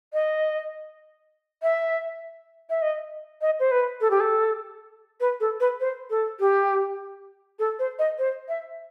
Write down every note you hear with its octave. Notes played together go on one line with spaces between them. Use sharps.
D#5
E5
E5
D#5
D#5
C5
B4
A4
G4
A4
B4
A4
B4
C5
A4
G4
A4
C5
D#5
C5
E5